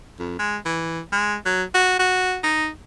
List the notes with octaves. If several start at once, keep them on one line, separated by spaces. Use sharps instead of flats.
F2
G#3
E3
G#3
F#3
F#4
F#4
D#4